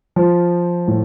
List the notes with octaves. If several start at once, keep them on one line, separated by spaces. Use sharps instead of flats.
F3
A2